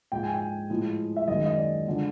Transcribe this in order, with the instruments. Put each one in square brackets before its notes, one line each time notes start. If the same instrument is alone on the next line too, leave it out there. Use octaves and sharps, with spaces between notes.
[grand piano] G#2 F3 G#3 G5
G#5
G5
A2 F3 G#3
E5
F#2 D#3 G#3 D#5
D#5
D5
D3 F3 G#3